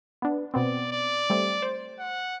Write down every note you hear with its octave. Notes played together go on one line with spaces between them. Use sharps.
B3 D4
B2 B3 C4 D5
D5
G3 A3 C4
C5
F#5